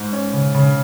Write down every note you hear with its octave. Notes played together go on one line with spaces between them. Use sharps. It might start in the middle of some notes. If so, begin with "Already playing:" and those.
Already playing: G#2
C#4
C#3
C#3